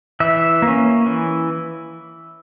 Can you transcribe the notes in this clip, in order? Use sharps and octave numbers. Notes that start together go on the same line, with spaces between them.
E3 E5
A#3
C#4
E3